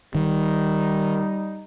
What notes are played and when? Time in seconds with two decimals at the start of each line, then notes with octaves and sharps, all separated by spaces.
0.15 D#3 G3 D#4